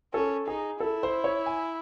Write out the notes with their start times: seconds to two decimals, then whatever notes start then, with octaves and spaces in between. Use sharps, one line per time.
0.14 C#4 A4
0.47 D#4 G#4
0.80 E4 A4
1.03 C5
1.24 C#5
1.46 G#5